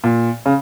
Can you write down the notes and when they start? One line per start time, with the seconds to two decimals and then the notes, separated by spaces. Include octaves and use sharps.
0.04 A#2
0.46 C#3